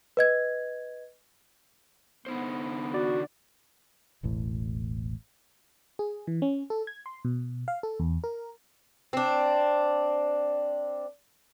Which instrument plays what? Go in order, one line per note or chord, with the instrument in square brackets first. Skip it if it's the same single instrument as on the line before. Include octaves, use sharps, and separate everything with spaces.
[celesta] B4 D#5 G#6
[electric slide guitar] D3 D#4 C5 [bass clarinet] B3
[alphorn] F#4 [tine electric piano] D5
[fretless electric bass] E1 A1 A2
[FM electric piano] G#4
E3
C#4
A4
G#6
C6
B2
F5
A4
E2
A#4
[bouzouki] C4 D4